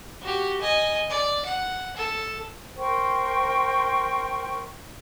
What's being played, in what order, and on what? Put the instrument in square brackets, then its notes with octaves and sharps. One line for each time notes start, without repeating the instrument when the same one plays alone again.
[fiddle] F#4 G4
D#5 G#5
D5
F#5
A4
[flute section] A#4 C5 G5 C#6